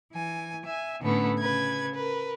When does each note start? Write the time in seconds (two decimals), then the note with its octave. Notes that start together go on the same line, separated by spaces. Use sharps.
0.13 E3 G#5
0.64 E5 G#5
1.01 A2 D3 A3 B3 C#4 E4
1.39 C#3 B4 G#6
1.94 A#4 B4